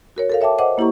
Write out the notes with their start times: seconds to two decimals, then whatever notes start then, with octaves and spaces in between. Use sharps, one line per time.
0.16 F#4 A#4 C#5
0.30 A4 A#4 F5
0.41 C#5 E5 G5 A5 D6
0.58 C5 D#5 F#5 D6
0.78 A#3 E4 G4 A#5 C#6